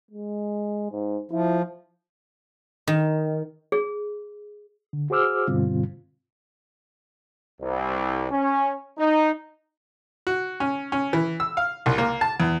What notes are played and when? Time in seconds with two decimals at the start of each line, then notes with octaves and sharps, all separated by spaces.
0.11 G#3
0.91 G#2
1.31 F3 E4
2.87 D#3
3.72 G#4
4.93 D3
5.10 F#4 G#4 C5 D6 E6 F6
5.47 G2 B2 D3 G3 C4 F4
7.61 C2
8.31 C#4
8.98 D#4
10.27 F#4
10.60 C#4
10.92 C#4
11.13 E3
11.40 E6
11.57 F5
11.86 C2
11.98 A#3
12.21 A5
12.40 E2